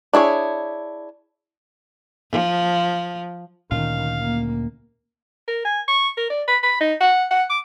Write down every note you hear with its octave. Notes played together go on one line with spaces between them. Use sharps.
D4 E4 G#4 C#5
F3
D2 A#2 D#3 C#4 F5
A#3
A#4
G#5
C#6
A#4
D5
B5
B5
D#4
F#5
F#5
D6